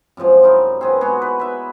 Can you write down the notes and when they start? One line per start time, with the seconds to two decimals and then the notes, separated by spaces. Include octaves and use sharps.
0.17 F#2 C3 F3 G#3
0.43 D#4 E4 A#4 D#5
0.81 C4 G#4 B4
1.01 G#3 B3 F#4 G#4
1.22 B4
1.40 B4 E5